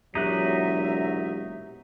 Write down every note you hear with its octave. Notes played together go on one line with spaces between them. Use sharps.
E1 A#2 F#3 D#4 G4 E5 F#6